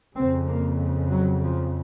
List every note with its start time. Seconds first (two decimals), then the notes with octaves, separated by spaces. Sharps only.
0.15 F2 C#3 C4
0.47 A#3
1.11 F#3
1.44 F3